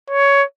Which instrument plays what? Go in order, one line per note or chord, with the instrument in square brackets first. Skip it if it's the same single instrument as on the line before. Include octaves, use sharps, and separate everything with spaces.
[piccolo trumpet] C#5